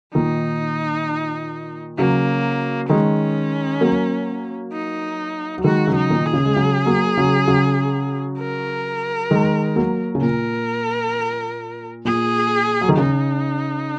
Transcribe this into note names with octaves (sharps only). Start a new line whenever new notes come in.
A#2 D#3 D#4
C#3 F#3 A#3
D#3 G#3 C#4
F#3 A#3
D#4
F#3
D#3 G#3 F#4
C#3 F#3
D#4
A#2 D#3
G#4
C#3
G#3
C#3 F#3
F#3 A#3
C#3 F#3
C#3 F#3
A#4
D#3 G#3
F#3 A#3
C#3
A#2 A#4
A#2 G#4
F#3
D#3
C#3 D#4